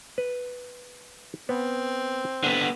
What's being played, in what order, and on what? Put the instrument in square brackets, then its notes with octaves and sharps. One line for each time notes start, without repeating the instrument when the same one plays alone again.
[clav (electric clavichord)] B4
[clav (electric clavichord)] B3 [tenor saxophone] C4
[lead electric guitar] D3 B3